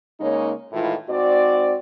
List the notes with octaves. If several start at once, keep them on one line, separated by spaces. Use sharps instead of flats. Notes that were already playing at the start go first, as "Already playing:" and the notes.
C#3 G#3 A#3 D#4 C#5
A2 D#3 E3 G#3 E4 F4
G#2 C4 F#4 D5